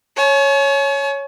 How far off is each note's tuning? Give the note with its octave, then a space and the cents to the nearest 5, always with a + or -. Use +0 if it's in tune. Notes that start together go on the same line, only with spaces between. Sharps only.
C#5 +0 G#5 +45